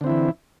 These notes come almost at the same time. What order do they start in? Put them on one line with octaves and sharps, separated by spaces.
D3 C4 E4 E3